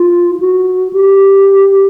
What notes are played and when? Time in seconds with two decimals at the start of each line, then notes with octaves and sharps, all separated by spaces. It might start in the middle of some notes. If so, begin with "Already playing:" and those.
Already playing: F4
0.35 F4
0.40 F#4
0.93 G4